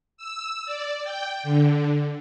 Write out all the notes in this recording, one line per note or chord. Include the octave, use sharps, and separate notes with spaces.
E6
D5
G5
D3